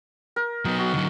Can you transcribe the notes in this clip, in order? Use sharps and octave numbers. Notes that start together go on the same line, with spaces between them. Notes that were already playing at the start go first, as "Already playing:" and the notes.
A#4
F#3 B3 D#4
F#4
D3 F#3